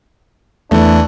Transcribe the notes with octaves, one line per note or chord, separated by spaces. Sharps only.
E2 E3 A3 D4